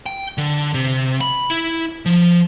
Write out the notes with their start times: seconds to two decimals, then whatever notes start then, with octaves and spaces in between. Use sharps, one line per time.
0.06 G5
0.38 D3
0.74 C3
1.21 B5
1.50 E4
2.06 F3